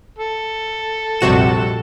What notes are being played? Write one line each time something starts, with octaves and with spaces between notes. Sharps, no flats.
A4
A#1 F2 C3 G3 F#4 E7